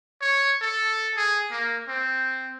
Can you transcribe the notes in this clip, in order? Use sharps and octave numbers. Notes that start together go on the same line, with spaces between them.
C#5
A4
G#4
A#3
C4